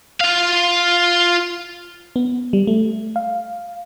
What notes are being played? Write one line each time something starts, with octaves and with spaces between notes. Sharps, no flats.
F4 F5
B3
G3
A3
F5